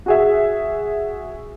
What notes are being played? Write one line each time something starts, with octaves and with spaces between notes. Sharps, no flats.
F#4 G#4 E5